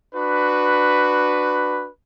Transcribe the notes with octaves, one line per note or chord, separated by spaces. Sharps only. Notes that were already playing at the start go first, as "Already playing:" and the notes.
D4 F#4 B4